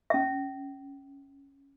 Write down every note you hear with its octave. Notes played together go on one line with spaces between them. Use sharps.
C#4 E5